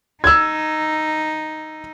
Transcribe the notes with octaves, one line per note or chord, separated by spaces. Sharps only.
D#4 E6 G#6